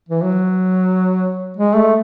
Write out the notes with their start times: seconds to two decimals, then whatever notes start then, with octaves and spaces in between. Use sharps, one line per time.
0.09 E3
0.23 F#3
1.57 G#3
1.76 A3